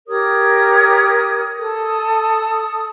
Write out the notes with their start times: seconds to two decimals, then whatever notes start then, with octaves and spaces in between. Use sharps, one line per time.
0.08 G4 A#4 C#5 D#6
1.57 A4 D#6